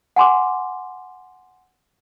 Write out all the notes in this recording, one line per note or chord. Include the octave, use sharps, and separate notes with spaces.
F#5 G#5 C6 D6